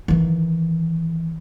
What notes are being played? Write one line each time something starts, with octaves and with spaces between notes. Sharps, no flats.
D#3 E3